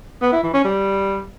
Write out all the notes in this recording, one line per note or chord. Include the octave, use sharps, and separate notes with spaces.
B3
E4
E3
C#4
G3